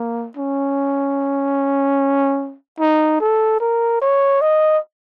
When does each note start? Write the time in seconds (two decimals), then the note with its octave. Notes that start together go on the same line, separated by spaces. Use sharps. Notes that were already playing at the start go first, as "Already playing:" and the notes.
Already playing: A#3
0.37 C#4
2.79 D#4
3.20 A4
3.60 A#4
4.01 C#5
4.41 D#5